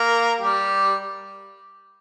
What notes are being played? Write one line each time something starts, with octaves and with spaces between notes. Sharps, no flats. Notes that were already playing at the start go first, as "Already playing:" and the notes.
Already playing: A#3 A#4
G3 G4